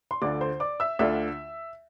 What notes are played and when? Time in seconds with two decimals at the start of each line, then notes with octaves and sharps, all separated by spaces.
0.11 C6
0.21 D2 D3 A3 D4 F4 D5 D6
0.41 C5 C6
0.60 D5 D6
0.80 E5 E6
0.99 D2 D3 A3 D4 F4 E5 E6